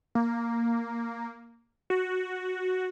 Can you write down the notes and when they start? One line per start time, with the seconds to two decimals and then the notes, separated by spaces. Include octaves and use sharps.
0.15 A#3
1.90 F#4